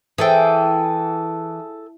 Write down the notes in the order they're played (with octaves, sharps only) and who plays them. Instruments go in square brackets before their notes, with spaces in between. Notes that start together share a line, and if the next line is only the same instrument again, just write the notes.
[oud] E3 [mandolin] G#4 A4 G5